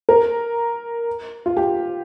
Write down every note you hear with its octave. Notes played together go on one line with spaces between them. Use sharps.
A#4
F4
G4